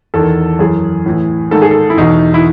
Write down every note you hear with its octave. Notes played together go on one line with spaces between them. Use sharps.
E2 D#3 A4
F#2 E3 G#4
A2 E3
G#2 D#3 A4
G#4
A4
E4
E2 B2 D#4
E4